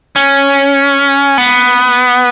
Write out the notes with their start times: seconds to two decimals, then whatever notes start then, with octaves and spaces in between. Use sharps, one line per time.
0.16 C#4
1.38 B3